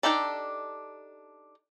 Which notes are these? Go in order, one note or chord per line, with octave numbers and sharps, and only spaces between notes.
D4 D#4 G4 A4 D5